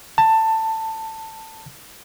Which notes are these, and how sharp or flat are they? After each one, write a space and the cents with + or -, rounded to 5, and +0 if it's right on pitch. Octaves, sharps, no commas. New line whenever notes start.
A5 +15